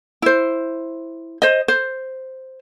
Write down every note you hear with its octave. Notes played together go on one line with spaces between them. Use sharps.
E4 C5
C5 D#5
C5